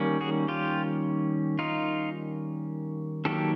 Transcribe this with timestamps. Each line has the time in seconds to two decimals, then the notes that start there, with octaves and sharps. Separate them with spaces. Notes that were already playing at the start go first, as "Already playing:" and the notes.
Already playing: D#3 G3 A#3 C#4
0.21 F#4 G#4
0.48 F4 G4
1.59 D#4 F4
3.25 D#3 F#3 A#3 G4 A4